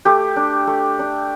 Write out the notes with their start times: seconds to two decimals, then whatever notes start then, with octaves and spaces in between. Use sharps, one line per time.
0.05 A3 G4
0.36 D4
0.67 A3
0.99 D4